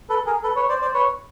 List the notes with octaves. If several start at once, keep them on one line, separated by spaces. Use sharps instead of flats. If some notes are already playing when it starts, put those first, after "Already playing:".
A4 B4
G#4 A#4
A4 B4
B4 C#5
C5 D5
C5 D5
B4 C#5